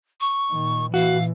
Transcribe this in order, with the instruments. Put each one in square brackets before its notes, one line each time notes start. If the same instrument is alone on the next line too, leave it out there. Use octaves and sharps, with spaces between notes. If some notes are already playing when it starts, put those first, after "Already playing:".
[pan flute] C#6
[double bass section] A#2 D#3
[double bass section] A#2 E3 [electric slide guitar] F#4 [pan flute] F5